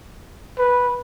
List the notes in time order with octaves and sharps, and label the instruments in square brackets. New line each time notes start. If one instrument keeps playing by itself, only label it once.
[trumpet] B4